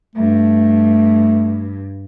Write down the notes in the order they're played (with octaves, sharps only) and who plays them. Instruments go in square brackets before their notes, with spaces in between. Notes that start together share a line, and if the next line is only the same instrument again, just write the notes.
[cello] G2 [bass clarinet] A3